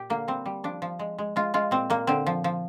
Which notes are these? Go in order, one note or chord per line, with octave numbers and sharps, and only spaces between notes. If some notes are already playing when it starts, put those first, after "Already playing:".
Already playing: A#2 G4
D3 A#3
G3 C4
G3
F3 D4
F3
G#3
G#3
G#3 F4
G#3 F4
A#2 C4
A#2 A#3
D3 C4
F3
F3